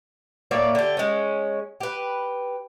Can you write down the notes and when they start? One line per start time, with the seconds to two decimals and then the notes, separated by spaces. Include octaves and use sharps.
0.51 A2 A#3 C#5 D5
0.75 D3 G4
0.97 G#3 C#4
1.80 G4 B4